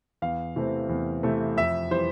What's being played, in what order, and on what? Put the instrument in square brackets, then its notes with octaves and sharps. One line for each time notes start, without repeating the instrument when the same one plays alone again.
[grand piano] E2 F5
C3 E3 A3 C4
E2
C3 E3 A3 C4
F2 E5
E3 G3 C5